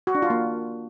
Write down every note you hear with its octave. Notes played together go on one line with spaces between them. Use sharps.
F#4
D4
F4
A#3